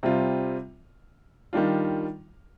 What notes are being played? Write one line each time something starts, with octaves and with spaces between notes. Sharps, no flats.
C3 G3 C4 F4
D#3 G3 D4 F4